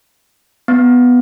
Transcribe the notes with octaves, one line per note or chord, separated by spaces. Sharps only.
B3